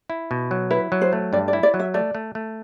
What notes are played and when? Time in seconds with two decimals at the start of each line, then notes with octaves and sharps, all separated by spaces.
0.10 E4
0.31 B2
0.51 F#3
0.71 E4 B4
0.92 F#3
1.01 C5
1.13 A3
1.33 G2 D5
1.48 D5
1.53 E4
1.63 D5
1.74 F#3
1.79 E5
1.94 A3 D5
2.15 A3
2.35 A3